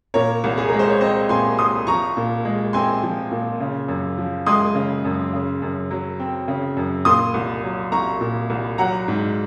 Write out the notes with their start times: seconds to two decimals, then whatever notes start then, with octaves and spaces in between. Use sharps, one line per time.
0.14 A#2 A#4 C#5
0.44 C2
0.58 G#4
0.69 G#3 A#4
0.79 C5
0.90 C#5
1.00 C4 C5 D#5
1.29 A#2 G#5 C6
1.59 C2 C6 D#6
1.87 F3 A#5 C#6
2.17 A#2
2.45 G#3
2.73 C4 G#5 C6
3.03 F3
3.31 A#2
3.60 C#3
3.88 F#2
4.18 F3
4.46 G#3 C6 D#6
4.75 C#3
5.05 F#2
5.33 C#3
5.62 F#2
5.91 F#3
6.20 C4
6.48 C#3
6.77 F#2
7.05 A#2 C6 D#6
7.34 C2
7.64 F#3
7.92 C2 A#5 C#6
8.21 A#2
8.50 C2
8.78 F#3 F#5 A#5
9.08 G#2